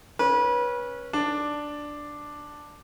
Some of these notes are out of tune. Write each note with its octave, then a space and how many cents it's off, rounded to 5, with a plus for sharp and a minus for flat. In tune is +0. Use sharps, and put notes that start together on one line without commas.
C#4 -10 B4 -30
D4 +0 D5 +0